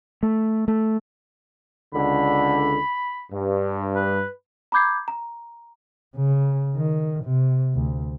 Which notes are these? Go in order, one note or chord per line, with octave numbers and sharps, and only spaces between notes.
A3
A3
C#2 D3 B5
G2
B4
A#5 B5 D6 G6 G#6 C7
A#5
C#3
D#3
C3
D2